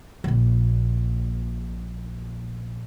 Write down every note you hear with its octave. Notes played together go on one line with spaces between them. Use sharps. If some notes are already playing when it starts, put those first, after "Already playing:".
A#1 A#2